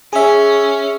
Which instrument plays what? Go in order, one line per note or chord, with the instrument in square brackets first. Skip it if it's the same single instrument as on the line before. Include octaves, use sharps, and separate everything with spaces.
[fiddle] C#4 [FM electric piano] G#4 E5